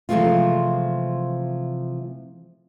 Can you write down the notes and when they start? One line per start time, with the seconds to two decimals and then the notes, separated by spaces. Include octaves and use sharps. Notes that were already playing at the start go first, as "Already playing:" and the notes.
0.09 C3 E3 F3 G#3 A3 F4